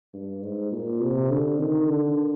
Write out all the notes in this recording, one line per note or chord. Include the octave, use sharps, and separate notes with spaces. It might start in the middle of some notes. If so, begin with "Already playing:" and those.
G2
G#2
A#2
C3
D3
D#3
D3